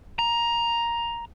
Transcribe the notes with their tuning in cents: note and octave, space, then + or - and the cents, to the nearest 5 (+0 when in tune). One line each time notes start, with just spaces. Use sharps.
A#5 +10